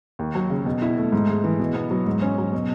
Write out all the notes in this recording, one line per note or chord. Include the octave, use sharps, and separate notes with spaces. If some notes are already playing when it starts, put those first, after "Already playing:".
D#2
F#3
C#3
B2
E4
A3
G#2
G#3
E3
B2
B3
F#3
G#2
C#4
F#3
B2